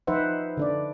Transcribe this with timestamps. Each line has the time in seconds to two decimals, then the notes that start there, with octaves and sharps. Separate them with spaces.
0.07 F3 D#4 B4 C5 E5 F#5
0.57 D3 D4 D5